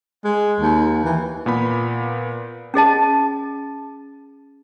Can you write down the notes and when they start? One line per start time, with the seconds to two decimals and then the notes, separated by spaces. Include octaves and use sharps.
0.25 G#3
0.60 D#2
1.04 E3
1.46 A#2 B3 B5
2.74 C#4 G#4 D#5 A5